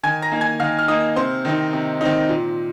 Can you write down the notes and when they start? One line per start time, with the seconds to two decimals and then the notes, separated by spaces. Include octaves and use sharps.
0.03 D#3 G#5 G#6
0.22 A#5 A#6
0.31 A#3 D#4
0.41 G#5 G#6
0.60 D#3 F5 F6
0.79 F6
0.88 A#3 D#4 D#5 D#6
1.16 C3 C5 C6
1.45 D#3 C4 D#4
1.73 C3
2.01 D#3 C4 D#4
2.29 A#2